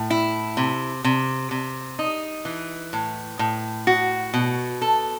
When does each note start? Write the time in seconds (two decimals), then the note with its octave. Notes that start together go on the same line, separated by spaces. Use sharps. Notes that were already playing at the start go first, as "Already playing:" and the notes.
Already playing: A2
0.10 E4
0.57 C3
1.04 C3
1.51 C3
1.99 D#4
2.45 E3
2.93 A2
3.39 A2
3.87 F#4
4.34 B2
4.82 A4